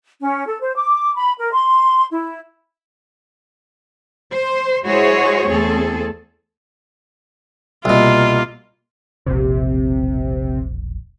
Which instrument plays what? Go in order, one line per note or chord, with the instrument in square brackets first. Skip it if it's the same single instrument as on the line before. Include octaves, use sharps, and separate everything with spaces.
[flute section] C#4
A4
C5
D6
B5
A#4
C6
E4
[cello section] C5
G#3 E4 F#4 G#4 C5 C#5
E2 A3 C4 G#4 A4
[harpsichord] C2 B2 [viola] A#3 F4
[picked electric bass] E1 A#1 [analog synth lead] C3